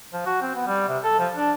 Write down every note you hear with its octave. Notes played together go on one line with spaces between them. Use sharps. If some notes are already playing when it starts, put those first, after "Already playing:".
F3
F#4
C4
B3
G3
C3
A4
F3
D4